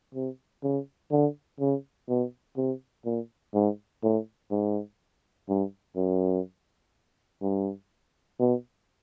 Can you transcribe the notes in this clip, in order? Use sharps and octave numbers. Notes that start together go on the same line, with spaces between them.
C3
C#3
D3
C#3
B2
C3
A#2
G#2
A2
G#2
G2
F#2
G2
B2